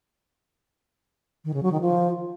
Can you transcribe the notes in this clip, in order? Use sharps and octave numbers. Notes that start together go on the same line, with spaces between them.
D#3
C#3
F#3
D#3
F3